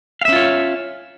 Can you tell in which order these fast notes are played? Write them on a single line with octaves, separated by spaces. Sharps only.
F5 E5 C#4 F4 C#5